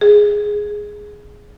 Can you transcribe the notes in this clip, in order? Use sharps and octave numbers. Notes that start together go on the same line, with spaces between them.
G#4